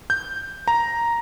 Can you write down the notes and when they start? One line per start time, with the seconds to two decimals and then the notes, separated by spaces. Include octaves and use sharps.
0.10 G6
0.68 A#5